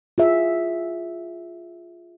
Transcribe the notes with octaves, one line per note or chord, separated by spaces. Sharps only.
F4 G#4 E5